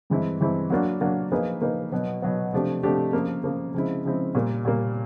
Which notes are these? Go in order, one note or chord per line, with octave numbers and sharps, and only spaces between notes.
G2 E3 G#3 C4 E4
G2 E3 G#3 C4 E4
F#3 A#3 D4 F#4
F#3 A#3 D4 F#4
F3 A#3 D#4 G#4 B4
F3 A#3 D#4 G#4 B4
B2 F#3 B3
B2 F#3 B3
C3 F3 A3 D4 G4
C3 F3 A3 D4 G4
C#3 F3 A#3
C#3 F3 A#3
C#3 F3 G#3 C4 E4
C#3 F3 G#3 C4 E4
A#2 G3 A#3
A#2 G3 A#3